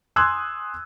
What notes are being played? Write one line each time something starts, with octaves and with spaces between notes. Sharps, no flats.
G#5 C6 D#6 E6 F#6 G#6